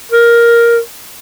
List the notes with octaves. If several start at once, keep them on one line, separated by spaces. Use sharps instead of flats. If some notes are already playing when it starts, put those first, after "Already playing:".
A#4